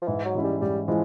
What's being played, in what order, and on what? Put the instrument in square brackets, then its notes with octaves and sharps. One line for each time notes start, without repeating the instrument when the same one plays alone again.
[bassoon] F3
[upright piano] G#2 [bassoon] E3
[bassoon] F#3
[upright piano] E3 G#3 C#4 E4
[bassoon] G3
[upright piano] G#2 [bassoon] G3
[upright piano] E3 G#3 [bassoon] F3